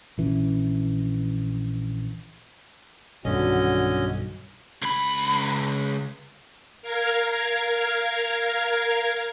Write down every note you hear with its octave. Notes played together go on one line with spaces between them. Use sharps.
A#1 E3 C#4
B1 G2 D3 D#3 C#4 F#4 D#5
C#2 B5
A#4 F5 G#6